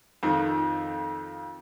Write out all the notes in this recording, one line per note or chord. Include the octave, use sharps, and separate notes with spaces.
F2 D#3